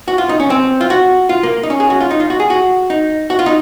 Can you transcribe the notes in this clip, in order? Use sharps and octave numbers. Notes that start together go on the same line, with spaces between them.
F#4
F4
D#4
C#4
C4
F4
F#4
F4
A#3
D#4
C#4
G#4
F#4
F4
D#4
F4
F#4
G#4
F#4
D#4
F#4
F4
D#4